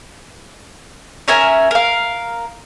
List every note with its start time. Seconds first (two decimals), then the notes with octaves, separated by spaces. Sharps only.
1.28 C#4 A#4 E5 G#5
1.71 A#4 F5